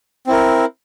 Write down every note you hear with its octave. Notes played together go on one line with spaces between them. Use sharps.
C4 E4 A#4